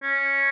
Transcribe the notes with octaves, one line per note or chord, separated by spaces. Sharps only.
C#4